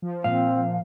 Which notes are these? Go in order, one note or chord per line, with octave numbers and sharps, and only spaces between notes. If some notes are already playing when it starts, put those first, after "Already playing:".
F3
A#2 C4 F5